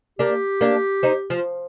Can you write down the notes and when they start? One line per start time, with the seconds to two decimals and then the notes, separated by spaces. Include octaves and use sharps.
0.19 A#3 D4 G4
0.61 A#3 D4
1.03 C4 D#4
1.30 F3